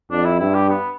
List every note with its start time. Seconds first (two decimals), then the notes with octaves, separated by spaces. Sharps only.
0.11 F2 D4
0.25 E4
0.40 G2 E4
0.55 G4
0.70 B3